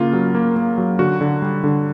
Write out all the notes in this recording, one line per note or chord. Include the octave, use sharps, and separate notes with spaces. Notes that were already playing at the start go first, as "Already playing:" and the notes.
Already playing: C#3 A#3 F4
F#3
A#3
A#3
F#3
D3 F#4
D3
G3
D3